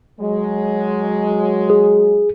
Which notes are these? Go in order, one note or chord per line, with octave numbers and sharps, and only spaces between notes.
F#3 G#3
G#4